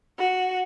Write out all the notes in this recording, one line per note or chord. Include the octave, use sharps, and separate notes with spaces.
F#4